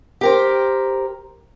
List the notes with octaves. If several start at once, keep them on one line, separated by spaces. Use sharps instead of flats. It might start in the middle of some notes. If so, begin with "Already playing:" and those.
G4 A#4 C5